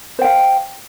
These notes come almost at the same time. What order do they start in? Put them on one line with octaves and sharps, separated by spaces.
C5 G5 F5